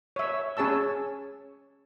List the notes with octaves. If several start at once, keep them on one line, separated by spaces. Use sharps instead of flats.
C#5 E5
C#4 G#4 C#5 A5 E6